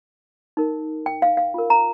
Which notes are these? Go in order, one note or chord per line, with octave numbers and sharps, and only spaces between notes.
D#4 A#4
G5
F5
F5
F4 A#4
A#5